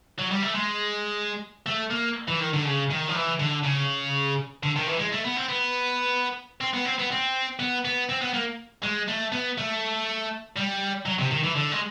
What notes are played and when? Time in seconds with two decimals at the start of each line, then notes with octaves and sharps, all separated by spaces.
0.18 F#3
0.31 G3
0.42 A3
0.55 G#3
1.66 A3
1.91 A#3
2.28 E3
2.40 D#3
2.54 D3
2.65 C#3
2.90 D#3
3.08 F3
3.15 E3
3.40 D3
3.64 C#3
4.63 D3
4.76 D#3
4.87 E3
5.00 G#3
5.13 A3
5.25 B3
5.37 C4
5.49 B3
6.61 C4
6.73 B3
6.85 C4
6.98 B3
7.11 C4
7.60 B3
7.85 B3
8.09 C4
8.21 B3
8.34 A#3
8.83 G#3
9.08 A3
9.32 B3
9.58 A3
10.56 G3
11.06 F#3
11.19 C3
11.31 D#3
11.43 E3
11.55 D3
11.72 G#3